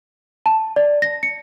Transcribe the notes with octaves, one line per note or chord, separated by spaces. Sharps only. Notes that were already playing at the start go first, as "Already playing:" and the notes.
A5
D5
A#6
C#7